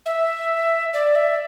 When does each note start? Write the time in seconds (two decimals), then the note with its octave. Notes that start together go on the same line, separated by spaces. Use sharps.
0.06 E5
0.93 D5
1.15 E5